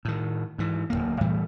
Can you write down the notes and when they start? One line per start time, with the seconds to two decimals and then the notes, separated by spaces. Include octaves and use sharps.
0.05 A2 D#3
0.58 G#2 E3
0.90 D1 B1 A#3
1.20 A2 E3 G3 A3